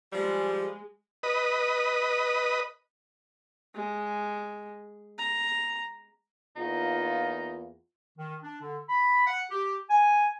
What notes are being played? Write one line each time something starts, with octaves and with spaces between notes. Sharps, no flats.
F3 G3 G#3
B4 D#5
G#3
A#5
E2 A#3 D#4 F4
D#3
D4
D3
B5
F#5
G4
G#5